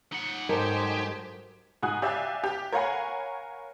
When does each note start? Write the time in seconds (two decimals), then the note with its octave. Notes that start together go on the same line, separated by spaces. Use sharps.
0.12 D#4 F#5
0.49 G#2 F#3 D#4 G4 A4 A#4 C5 G#5
1.83 G#2 F#4 G#5 D#6 F#6
2.02 G4 D5 E5 F5 G#5
2.44 G4
2.72 A#4 C#5 F5 F#5 G#5 B5